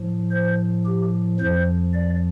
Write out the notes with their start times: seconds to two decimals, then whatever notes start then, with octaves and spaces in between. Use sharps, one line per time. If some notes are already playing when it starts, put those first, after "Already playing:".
Already playing: A2 F3
0.31 C5
0.86 G4
1.39 F2 F3 C5
1.94 D5